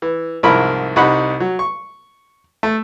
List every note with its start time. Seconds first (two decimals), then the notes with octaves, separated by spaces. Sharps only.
0.02 E3
0.43 C2 G#2 F3 E4 A#4 B5
0.96 C2 G3 D#4 F#5 B5
1.40 F#3
1.59 C#6
2.63 A3